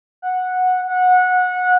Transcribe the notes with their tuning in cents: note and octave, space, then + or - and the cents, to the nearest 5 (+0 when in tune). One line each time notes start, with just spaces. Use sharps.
F#5 -10
F#5 -20